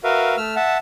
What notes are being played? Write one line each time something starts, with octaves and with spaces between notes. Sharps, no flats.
F#4 A#4 B4 E5 F5
A3 E6 F6
E5 F#5 A5